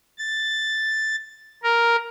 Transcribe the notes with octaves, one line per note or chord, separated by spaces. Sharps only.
A6
A#4